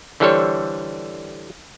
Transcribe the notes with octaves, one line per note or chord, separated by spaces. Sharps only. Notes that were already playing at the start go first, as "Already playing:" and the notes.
D3 E3 G3 A4 C5 C#5